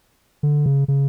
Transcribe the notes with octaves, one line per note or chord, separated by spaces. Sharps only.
D3
C#3
C#3